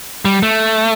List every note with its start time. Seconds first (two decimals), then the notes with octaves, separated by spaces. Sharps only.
0.25 G3
0.43 A3